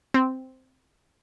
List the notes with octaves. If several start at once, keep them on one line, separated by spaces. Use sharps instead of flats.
C4